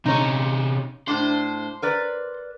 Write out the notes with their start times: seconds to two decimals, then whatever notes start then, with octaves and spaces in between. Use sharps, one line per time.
0.06 C3 C#4 D#4 C#5
1.08 A2 D4 C5
1.82 A#4 B4 D5